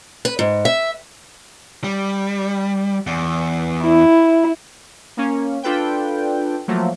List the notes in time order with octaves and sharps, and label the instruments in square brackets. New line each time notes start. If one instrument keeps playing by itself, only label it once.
[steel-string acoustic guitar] B4
G#2
E5
[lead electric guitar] G3
E2
[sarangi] E4
[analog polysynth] A#3 C#4
D4 F4 A4 B4 G5
F3 F#3 A3 A#3